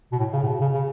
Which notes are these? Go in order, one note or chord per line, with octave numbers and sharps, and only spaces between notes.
B2
A2
C#3
A2
B2
C#3
C#3